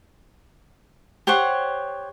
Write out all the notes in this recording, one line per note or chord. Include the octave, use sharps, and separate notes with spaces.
G4 C5 C#5 F#5